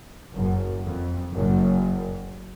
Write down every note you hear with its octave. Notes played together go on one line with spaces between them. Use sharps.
F#1 F#2
F2
F#1 F#2